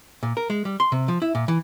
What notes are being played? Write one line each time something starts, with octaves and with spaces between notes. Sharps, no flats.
A#2
A#4
G#3
G3
C6
C3
F3
E4
A#2
E3